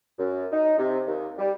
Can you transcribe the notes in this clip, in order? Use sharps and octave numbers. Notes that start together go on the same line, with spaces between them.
F#2
D#4
C3
D#2
G3